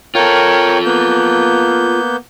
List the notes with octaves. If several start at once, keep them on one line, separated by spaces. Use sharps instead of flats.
F4 A4 A#4 C#5 G5
A#3 B3 G6